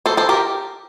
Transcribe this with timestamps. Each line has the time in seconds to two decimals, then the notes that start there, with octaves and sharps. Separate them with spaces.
0.06 A4 C5
0.17 A4 C5
0.29 G4 A#4